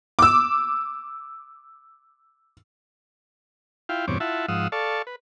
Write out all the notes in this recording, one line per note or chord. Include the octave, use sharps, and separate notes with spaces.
D6 E6
E4 F4 F5 G5
E2 G2 B2 C4 C#5 D6
E4 F4 E5 F#5 A5
G#2 F3 F5 F#5 D#6 E6
A4 D5 F5 A5 C#6
B4